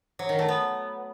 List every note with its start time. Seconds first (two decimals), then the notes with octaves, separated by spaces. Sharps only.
0.19 F#3
0.29 D#3
0.39 A3
0.48 B3